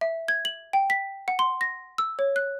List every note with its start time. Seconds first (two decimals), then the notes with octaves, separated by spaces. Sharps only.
0.01 E5
0.28 G#6
0.45 F#7
0.73 G5
0.90 B6
1.28 F#5
1.39 C6
1.61 A#6
1.98 E6
2.19 C#5
2.36 F#6